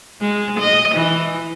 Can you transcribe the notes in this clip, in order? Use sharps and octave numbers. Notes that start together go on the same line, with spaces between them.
G#3
D#5
E3